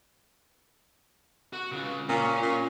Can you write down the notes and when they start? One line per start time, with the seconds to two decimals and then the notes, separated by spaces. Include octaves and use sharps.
1.53 F#4
1.72 C#3 F4
2.09 A#2 C#4
2.42 A#2